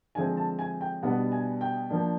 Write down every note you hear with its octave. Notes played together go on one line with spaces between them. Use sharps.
D3 F3 G#3 C4 G#5
A5
G#5
G5
B2 G3 B3 D4 F#5
G#5
G5
F3 A#3 D4